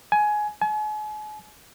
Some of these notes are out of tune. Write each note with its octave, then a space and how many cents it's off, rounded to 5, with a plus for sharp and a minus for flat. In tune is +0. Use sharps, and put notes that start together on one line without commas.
G#5 +15
G#5 +40